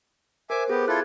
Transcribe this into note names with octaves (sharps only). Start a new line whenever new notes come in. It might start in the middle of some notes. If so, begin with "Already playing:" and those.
A#4 C5 E5 G#5 D6
B3 G4 G#4
E4 F4 A4 F#6 G#6